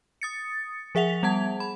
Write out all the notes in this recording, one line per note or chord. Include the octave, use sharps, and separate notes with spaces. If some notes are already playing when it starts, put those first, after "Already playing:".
D#6 A6 C#7
F3 G#4 E5 F#5 F7
G3 B3 F#5 A5 G#6
B5